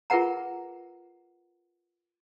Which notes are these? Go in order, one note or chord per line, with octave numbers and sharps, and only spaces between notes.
F4 G#4 A#4 B4 F#5 A#5